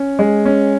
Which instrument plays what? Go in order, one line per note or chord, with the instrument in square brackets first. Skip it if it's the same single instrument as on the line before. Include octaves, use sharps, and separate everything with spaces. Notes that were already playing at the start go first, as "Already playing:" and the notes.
Already playing: [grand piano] C#4
G#3
C#4